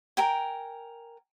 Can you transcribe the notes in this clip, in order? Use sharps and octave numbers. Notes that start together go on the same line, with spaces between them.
A#4 G5 G#5